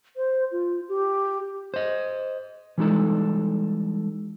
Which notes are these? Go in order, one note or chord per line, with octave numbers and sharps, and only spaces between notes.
C5
F4
G4
C5 D#5
E3 G3 G#3 D#4 A4